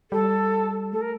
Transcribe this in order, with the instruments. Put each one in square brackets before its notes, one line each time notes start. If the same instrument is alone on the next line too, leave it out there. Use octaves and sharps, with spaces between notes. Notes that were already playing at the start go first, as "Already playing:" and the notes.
[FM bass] G3 [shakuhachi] A4
[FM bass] A3 [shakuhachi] A4
[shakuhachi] A#4